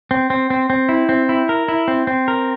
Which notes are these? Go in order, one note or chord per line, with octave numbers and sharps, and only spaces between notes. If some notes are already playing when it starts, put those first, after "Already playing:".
C4
C4
C4
C4
E4
C4
E4
A#4
E4
C4
C4
A#4